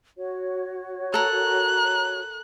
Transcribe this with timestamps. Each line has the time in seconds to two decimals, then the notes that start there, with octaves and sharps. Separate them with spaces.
0.17 F#4 C#5
1.14 A4 A#4 A#5 F#6